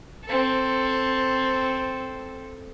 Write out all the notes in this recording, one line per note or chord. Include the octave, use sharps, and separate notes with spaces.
C4 A4